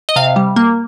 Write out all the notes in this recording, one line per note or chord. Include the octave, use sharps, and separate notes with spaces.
D#5
C3 F5
G3
A#3